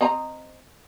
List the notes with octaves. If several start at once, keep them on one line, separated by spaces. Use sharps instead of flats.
C4 D#5 A#5